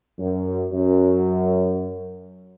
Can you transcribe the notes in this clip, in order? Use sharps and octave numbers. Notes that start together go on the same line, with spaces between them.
F#2
F#2